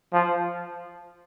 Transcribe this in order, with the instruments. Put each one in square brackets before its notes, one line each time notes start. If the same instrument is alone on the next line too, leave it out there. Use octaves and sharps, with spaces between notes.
[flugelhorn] F3